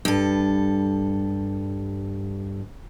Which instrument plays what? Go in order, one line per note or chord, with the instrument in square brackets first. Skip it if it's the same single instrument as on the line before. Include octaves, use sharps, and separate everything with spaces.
[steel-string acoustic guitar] G2 A4